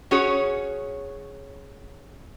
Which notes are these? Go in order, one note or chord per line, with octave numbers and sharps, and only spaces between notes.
C#4 F#4 G#4 C#5